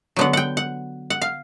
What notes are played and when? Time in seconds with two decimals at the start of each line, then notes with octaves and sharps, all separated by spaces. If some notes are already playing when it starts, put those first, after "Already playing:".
0.16 D3 F#3 B3 F#5
0.33 F#5 G5
0.57 F#5
1.10 F#5
1.22 F5